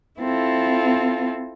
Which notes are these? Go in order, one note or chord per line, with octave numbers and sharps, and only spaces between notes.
C4 E4 F4 A4